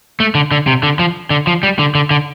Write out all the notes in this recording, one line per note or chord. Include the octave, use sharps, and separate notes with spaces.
A3
D3
D3
C3
D3
F3
D3
F3
G3
D3
D3
D3